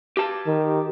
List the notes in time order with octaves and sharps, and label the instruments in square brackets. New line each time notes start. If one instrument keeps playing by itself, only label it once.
[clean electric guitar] G4 A5
[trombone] D#3